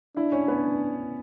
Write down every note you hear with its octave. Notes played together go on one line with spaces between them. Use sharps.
D4 E4 E5
C#4 C#5
B3 B4